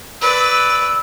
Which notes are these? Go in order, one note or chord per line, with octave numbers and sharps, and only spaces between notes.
B4 D5 E6